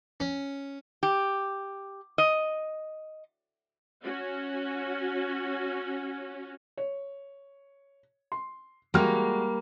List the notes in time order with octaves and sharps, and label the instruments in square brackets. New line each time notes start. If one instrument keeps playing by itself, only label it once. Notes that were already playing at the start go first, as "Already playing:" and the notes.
[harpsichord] C#4
[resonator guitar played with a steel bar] G4
D#5
[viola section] C#4 F#4
[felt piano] C#5
C6
[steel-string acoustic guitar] G3 A#3 [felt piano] G#3 F#4 F6